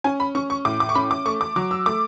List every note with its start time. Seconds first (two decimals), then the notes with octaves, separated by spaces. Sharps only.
0.04 C#4 G#5
0.20 B5
0.35 C#4 C#6
0.50 C#6
0.65 A2 D6
0.80 D6
0.89 C#6
0.95 C#4 B5
1.11 D6
1.26 A3 C#6
1.41 D6
1.56 F#3 D6
1.71 E6
1.86 A3 D6